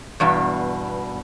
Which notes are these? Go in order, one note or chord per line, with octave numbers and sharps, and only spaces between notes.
E2 G2 B2